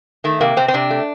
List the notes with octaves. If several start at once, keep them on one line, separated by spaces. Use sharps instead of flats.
D#3 A3
C3 A#3
C3 C4
C4
C3 D4
A3